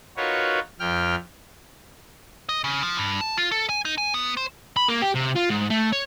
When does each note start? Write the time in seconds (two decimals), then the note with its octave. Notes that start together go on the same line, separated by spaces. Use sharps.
0.17 D#4 F4 F#4 A#4 B4 C#5
0.80 F2 G5 F6
2.49 D#5
2.64 C#3
2.83 F3
2.97 G2
3.21 A5
3.38 F4
3.51 A4
3.69 G#5
3.85 D#4
3.98 G#5
4.14 B3
4.37 C5
4.77 B5
4.88 A#3
5.02 G4
5.15 C3
5.35 F4
5.50 G#2
5.70 A3
5.92 C#5